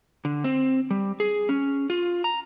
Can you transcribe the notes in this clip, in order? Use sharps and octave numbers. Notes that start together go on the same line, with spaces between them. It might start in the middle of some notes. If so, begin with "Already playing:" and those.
D3
C4
G3
G#4
C#4
F4
A#5